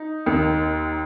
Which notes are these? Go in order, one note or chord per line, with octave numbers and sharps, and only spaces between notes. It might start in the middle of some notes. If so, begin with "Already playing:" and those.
Already playing: D#4
D#2 D#3